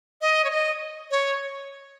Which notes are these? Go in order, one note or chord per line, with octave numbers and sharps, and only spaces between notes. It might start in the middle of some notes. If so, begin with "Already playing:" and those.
D#5
C#5
D#5
C#5